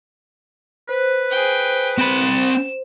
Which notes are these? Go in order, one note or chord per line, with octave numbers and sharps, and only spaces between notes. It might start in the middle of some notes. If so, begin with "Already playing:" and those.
B4 C5
G#4 G5
C4 B5 E7